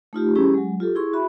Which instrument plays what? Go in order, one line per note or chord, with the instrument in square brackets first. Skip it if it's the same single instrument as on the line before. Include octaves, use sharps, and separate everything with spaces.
[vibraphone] A3 D#4 F4 G4
G3 C#4 E4 G4 G#4
F#3 G#3
F4 G4 A4
E4 G#4 C6 C#6
F#4 E5 B5